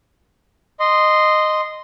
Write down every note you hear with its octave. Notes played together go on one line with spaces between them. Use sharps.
D#5 C6